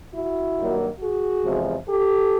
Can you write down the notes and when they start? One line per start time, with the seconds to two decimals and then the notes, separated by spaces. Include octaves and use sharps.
0.13 E4 F#4
0.57 G2 D#3 F#3 A#3
1.00 F#4 G#4
1.44 E2 C3 F3 G#3
1.87 G4 A4